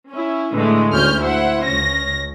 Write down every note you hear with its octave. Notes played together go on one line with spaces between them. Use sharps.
C#4 E4
A2 D3 E3 G#3 A3
D2 C#4 F6 G6
E4 C5 F#5
C#2 C#4 A#6